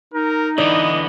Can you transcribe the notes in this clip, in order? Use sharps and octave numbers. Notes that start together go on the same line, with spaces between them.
D#4 A#4
D3 E3 B3 D5 D#5